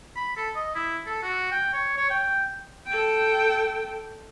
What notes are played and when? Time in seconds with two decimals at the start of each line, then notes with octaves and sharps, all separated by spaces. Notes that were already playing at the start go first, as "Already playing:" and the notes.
0.16 B5
0.36 A4
0.55 D#5
0.75 E4
1.06 A4
1.23 F#4
1.51 G5
1.73 C#5
1.97 C#5
2.10 G5
2.87 A4 G5